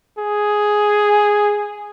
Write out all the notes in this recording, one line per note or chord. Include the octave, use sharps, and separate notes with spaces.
G#4